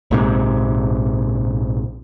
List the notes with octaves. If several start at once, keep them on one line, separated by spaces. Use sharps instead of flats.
A#1 G#2 C3